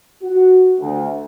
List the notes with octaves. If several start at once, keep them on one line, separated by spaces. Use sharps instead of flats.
F#4
D2